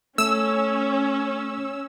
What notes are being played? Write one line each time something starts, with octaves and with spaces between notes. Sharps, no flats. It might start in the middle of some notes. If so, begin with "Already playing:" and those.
A3 C#4 E6